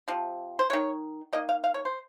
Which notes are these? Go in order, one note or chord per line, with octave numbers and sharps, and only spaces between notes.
C3 F3
C5
D#3 G#3 C#5
D#3 A#3 D#5
F5
F5
C#5
C5